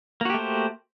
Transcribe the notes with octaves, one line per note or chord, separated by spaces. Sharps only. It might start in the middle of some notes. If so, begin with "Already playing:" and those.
A3 A#3 F#4 G4 C5